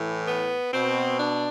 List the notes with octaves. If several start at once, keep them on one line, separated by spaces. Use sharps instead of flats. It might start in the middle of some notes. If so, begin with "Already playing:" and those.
Already playing: A2 E3
B3
B2 C4
D4